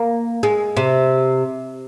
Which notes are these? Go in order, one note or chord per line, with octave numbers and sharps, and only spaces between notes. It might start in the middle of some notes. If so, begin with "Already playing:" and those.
Already playing: A#3
G#3
C3